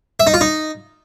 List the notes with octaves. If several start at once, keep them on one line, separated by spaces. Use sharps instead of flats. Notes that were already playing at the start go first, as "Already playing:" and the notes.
E5
D#4
F4
D#4